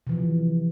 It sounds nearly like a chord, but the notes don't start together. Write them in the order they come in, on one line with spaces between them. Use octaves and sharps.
C3 E3 F3